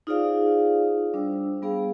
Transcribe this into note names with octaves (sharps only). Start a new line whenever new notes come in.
D#4 F4 G#4 C5 D5 F5
G3 D4 C5 E6
G3 B3 G#4 F5